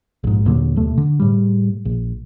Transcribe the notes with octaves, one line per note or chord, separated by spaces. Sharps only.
A#1 G#2
D#2 A#2 D3 F#3
D#2 B2 A3
D3
A2 G3
A#1